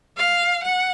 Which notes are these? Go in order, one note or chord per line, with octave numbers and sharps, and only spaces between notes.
F5
F#5